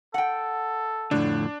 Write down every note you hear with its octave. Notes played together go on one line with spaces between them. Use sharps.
A4 F#5 G5
F2 A2 D3 D4